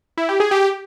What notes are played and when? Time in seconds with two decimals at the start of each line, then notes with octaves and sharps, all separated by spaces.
0.18 E4
0.29 G4
0.40 G#4
0.51 G4